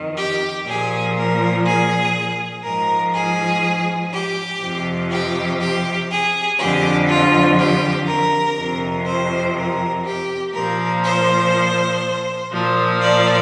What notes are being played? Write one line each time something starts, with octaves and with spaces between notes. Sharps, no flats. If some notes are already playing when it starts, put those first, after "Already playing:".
Already playing: F2 D#3
G4
A#2 F3 G#4
A#4
G#4
G#2 F3 A#4
G#4
G4
F2 C3 F3
G4
G4
G#4
F2 D3 F3 G4
F4
G4
A#4
F2 C3 F3
C5
A#4
G4
A#2 F3 A#4
C5
A#2 F3
D5